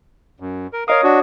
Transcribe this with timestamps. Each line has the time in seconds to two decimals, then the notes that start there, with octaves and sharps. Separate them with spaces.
0.40 F#2
0.73 A#4
0.88 A#4 C#5 D#5 F5 D#6
1.04 D4 F#4